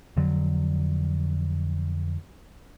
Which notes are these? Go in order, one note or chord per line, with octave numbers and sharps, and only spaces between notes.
F2 D3 F#3